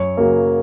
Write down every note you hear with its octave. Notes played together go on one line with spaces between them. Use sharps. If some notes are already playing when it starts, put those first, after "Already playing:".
Already playing: F#2 C#5
C#3 F#3 A#3